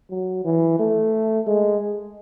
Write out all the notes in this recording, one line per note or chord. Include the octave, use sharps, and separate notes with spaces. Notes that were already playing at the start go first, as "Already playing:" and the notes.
F#3
E3
A3
G#3